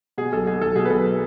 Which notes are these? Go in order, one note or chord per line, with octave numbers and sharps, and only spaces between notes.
B2 G#4
B1 A4
B2 G#4
B1 A4
B2 G#4
B4
B1 A4